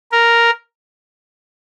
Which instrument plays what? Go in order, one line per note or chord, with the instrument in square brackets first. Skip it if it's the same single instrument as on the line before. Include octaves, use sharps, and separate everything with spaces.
[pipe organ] A#4